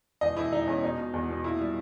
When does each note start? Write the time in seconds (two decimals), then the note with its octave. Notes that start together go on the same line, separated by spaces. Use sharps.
0.21 E1 D#5
0.37 E1 E4
0.53 E1 D#4
0.67 E2 C#4
0.83 B2 D#4
0.98 B2
1.14 E2
1.29 B2
1.44 A#2 E4
1.59 G3